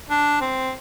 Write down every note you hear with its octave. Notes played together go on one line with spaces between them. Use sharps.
D4
C4